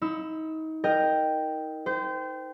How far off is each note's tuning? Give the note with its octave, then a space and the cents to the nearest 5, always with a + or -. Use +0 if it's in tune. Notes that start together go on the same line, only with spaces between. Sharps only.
D#4 +30 B5 +30 E6 +0
A#4 +0 D#5 -10 G5 +0
C5 -30 G5 +0